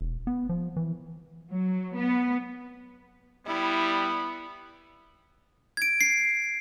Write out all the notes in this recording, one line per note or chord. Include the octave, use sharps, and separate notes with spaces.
E1
B3
F3
E3
F#3
B3
G3 B3 E4
G#6 D7
C7